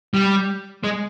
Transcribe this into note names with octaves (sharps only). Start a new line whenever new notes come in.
G3
G#3